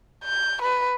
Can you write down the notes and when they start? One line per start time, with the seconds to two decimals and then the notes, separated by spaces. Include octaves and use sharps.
0.24 G6
0.62 B4